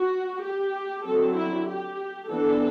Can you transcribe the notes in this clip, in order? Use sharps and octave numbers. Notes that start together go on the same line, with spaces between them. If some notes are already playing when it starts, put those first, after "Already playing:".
Already playing: F#4
G4
D3 F#3 C4 A4
E4
G4
E3 B3 D4 A4